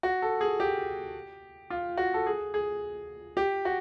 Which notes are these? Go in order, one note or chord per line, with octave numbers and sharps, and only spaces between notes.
F#4
A4
G#4
G4
F4
F#4
A4
G#4
G#4
G4
F#4